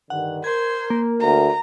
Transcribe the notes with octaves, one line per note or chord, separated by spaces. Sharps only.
G2 D3 D#3 F#5
A#4 C5 G#6
A#3
D2 A#5